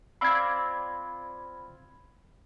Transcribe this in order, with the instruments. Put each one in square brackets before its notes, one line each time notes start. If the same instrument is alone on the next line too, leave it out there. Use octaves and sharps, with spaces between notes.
[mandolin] C4 F4 D5 [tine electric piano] B5 G#6